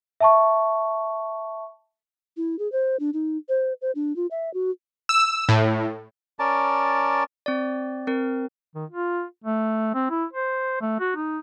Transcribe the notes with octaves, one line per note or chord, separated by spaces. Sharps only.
E5 A5 C#6
E4
G#4
C5
D4
D#4
C5
C5
D4
F4
E5
F#4
E6
A2
C#4 A#4 D5 A5
C4 D5
C4 A#4
D#3
F4
A3
C4
E4
C5
A3
F#4
D#4